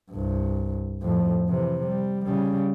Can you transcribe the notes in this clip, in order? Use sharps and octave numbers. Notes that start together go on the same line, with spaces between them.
C2 G2
F2 A2
C3 E3
G3
C#3 G3